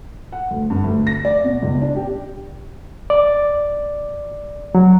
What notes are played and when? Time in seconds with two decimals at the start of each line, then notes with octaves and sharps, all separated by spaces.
0.32 F#5
0.51 D2
0.70 G2
0.84 D2
1.07 A#6
1.25 D5
1.44 B2
1.62 C#2
1.82 D4
1.96 G4
3.10 D5
4.75 F#3